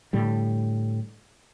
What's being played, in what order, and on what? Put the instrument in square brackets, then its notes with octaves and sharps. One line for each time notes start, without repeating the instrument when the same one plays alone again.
[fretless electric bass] A2 D3 G3